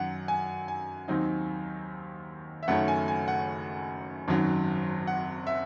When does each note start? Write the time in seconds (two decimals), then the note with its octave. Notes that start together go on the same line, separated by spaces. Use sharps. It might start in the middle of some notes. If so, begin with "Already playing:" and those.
Already playing: F#2 D#3 F#3 F#5
0.28 G#5
0.68 G#5
1.08 D#2 D#3 F#3 C4 D#4
2.63 E5
2.68 F#1 F#2 D#3 A3 C#4 F#5
2.88 G#5
3.08 G#5
3.28 F#5
4.28 G#1 F#2 D#3 F#3
5.07 F#5
5.47 E5